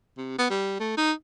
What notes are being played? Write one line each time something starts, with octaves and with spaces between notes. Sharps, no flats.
C3
B3
G3
A3
D#4